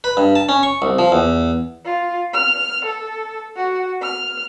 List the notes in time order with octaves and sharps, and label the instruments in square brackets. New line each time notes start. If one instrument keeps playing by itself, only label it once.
[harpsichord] B4
G2
A5
C#4
C#6
C2
F3
E2
[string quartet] F4
F6
A4
F#4
F6